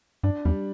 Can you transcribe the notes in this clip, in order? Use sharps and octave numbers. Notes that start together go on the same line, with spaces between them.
G2 D4
E2 G3